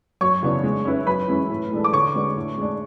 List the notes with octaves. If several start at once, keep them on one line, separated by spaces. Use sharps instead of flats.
F#2 C#5 C#6
C#3 E3 B3 D4
G#3
C#4 E4 B4
F#2 B4 B5
E3 G#3 C#4 E4
A2
E3 G#3 D4 A4
D6
D3 C#5 C#6
G#3 D4 F#4 B4
A2
G#3 D4